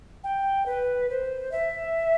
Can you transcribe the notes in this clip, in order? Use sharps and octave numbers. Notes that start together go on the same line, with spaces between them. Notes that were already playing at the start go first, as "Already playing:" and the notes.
G5
B4
C5
E5